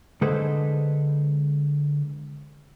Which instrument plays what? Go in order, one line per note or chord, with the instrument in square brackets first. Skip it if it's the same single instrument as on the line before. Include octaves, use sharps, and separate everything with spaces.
[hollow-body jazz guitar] D3 G#3 G#4 A4 B4 C5